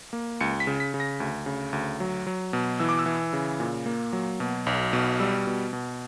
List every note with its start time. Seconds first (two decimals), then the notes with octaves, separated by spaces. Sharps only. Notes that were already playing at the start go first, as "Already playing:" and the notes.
0.13 A#3
0.41 C#2 C#7
0.60 B6
0.67 C#3
0.80 B6
0.94 C#3
1.00 A#6
1.20 D2
1.46 C#3
1.73 D2
2.00 F#3
2.27 F#3
2.53 B2
2.80 E3 E6
2.89 D6
2.99 E6
3.06 E3
3.33 C#3
3.60 A#2
3.86 A#3
4.13 F#3
4.40 B2
4.66 B1
4.93 B2
5.20 G3 E6
5.47 B2
5.73 B2